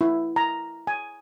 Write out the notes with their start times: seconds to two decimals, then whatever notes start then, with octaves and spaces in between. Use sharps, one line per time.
0.01 E4
0.36 A#5
0.87 G#5